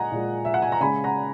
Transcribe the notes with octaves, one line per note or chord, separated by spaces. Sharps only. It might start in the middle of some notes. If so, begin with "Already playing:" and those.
Already playing: A#2 G#3 D#5 F#5 G#5 A#5
A#2 G#3
E5
F#5
G#5
A#5
C#3 G#3 G#5 B5
F#5 A#5